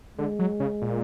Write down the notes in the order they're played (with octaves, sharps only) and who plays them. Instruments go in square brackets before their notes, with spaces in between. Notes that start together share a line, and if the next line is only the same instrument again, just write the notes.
[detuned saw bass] D3 [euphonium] G#3
[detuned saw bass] F#3
C#3
A#2